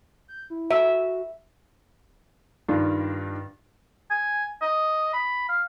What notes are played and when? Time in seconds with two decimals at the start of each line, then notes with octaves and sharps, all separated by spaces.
0.28 G6
0.50 E4
0.71 F#4 E5
2.69 G2 D#3 D4 F4
4.11 G#5
4.62 D#5
5.13 B5
5.49 F5